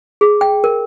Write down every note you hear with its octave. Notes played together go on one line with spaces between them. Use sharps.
G#4
G5
A#4